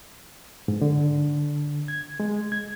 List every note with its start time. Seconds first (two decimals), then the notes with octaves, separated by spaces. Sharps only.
0.68 G#2
0.81 D3
1.88 G#6
2.20 G#3
2.52 G#6